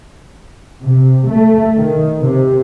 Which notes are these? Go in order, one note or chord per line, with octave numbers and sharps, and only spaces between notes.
C3
A3
D#3
C3